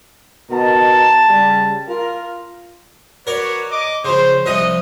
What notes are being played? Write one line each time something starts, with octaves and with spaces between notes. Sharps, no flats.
B2 D#3 A5 A#5
C#3 G3
F4 A#4
F#4 A#4 B4 C#5 D5
D#5 D6
C#3 F3 C5
C2 F3 D#5 F#5